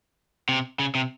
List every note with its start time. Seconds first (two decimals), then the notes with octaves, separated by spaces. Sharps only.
0.49 C3
0.79 C#3
0.95 C3